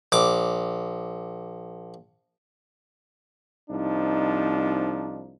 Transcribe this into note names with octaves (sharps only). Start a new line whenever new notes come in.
A#1 D6
C2 F3 D4 D#4